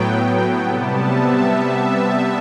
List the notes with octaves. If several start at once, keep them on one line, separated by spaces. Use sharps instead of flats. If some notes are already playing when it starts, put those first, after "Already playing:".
Already playing: A2 F#3 B3 G5
C3 G3 B3 A5
E5
E5